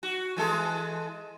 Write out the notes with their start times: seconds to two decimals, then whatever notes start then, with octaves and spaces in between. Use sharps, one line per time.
0.03 F#4
0.36 E3 G#3 A4